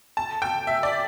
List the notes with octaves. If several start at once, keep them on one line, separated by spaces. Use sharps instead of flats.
A5
G5
E5
D5